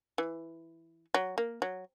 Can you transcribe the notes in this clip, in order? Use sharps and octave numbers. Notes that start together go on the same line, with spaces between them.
E3
F#3
A#3
F#3